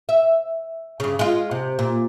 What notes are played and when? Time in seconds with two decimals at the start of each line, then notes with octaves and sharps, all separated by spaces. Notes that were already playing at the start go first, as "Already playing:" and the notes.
0.09 E5
1.00 G2 C#3
1.19 G#3 F4
1.51 C3
1.79 A#2